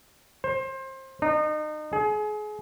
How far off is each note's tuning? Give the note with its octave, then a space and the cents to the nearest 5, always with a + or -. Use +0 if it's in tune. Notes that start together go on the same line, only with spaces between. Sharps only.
C5 +25
D#4 -35
G#4 +30